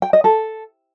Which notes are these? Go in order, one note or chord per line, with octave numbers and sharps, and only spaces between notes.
G5
D#5
A4